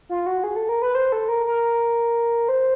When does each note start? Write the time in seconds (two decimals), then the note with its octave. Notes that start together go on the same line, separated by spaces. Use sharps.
0.09 F4
0.26 F#4
0.44 G#4
0.56 A4
0.69 A#4
0.82 B4
0.95 C5
1.12 A4
1.29 A#4
1.46 A#4
2.49 C5